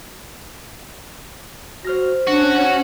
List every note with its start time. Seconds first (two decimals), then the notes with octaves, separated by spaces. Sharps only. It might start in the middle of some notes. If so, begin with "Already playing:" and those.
1.85 F#4 C5 F6 A#6
2.27 C#4 D4 F#4